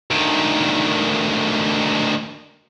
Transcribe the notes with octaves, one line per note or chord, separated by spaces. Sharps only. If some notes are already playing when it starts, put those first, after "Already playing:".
D2 D#3